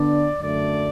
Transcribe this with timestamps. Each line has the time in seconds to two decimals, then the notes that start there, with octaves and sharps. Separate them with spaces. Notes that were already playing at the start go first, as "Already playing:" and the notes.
Already playing: D3 B3 D4 D5
0.41 F#2 D3 A3 D5